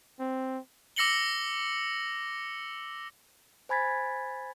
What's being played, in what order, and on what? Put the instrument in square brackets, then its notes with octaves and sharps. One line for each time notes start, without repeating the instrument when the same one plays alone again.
[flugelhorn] C4
[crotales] D6 E6 A#6 C#7 F#7 G7
[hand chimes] C5 G#5 B5 G#6 A6 B6